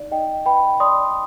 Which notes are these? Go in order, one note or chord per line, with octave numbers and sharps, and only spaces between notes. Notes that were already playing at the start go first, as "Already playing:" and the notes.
Already playing: D#4 D5 F5
D#4 D#5 G5
B4 G5 B5
D5 C6 D#6